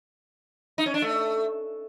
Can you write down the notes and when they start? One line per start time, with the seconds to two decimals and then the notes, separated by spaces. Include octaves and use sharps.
0.78 D#4
0.86 C#4
0.94 D4
1.02 A3